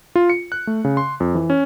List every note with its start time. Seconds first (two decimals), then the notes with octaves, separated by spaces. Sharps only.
0.15 F4
0.30 C#7
0.52 F#6
0.67 A3
0.84 C#3
0.97 C6
1.20 F2
1.35 E3
1.50 C#4